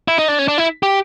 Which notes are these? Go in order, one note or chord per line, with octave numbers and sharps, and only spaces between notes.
E4
D#4
D4
C#4
D4
E4
G4